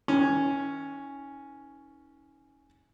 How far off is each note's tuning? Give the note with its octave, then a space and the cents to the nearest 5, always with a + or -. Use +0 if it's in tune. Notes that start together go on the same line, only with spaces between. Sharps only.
D#3 +45 C#4 +0